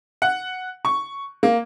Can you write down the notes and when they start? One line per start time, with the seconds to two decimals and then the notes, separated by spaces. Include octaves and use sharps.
0.22 F#5
0.85 C#6
1.43 A#3